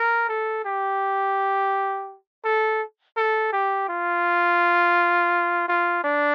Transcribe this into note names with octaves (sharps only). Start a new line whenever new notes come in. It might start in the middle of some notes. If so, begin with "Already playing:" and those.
Already playing: A#4
A4
G4
A4
A4
G4
F4
F4
D4